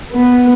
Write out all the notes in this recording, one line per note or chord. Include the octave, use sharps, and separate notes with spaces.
B3